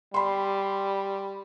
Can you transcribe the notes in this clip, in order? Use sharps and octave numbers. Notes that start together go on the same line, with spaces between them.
G3 B5 C6